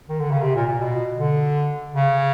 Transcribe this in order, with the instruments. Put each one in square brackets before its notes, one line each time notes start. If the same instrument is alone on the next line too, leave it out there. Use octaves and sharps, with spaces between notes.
[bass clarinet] D#3
D3
C#3
C3
A#2
A#2
B2
D3
C#3